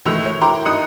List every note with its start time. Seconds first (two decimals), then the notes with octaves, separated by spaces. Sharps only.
0.06 C#2 D#3 E3 A3 E6 F7
0.25 C#5
0.41 E4 A#4 G5 A#5 C6 D6
0.65 G2 G3 D#4 D#6 F#6 C#7